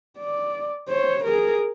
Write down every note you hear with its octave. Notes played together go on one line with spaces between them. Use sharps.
D5
C5 C#5
G#4 A#4